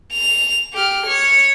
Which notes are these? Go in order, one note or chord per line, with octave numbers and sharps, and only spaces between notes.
F7
G4 F6
C#5